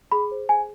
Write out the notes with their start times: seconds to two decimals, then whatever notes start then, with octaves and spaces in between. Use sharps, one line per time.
0.12 G#4 B5
0.31 C5
0.49 G#4 G#5